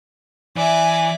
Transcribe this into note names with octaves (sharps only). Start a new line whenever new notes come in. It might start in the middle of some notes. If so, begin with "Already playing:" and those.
E3 D5 E5 G#5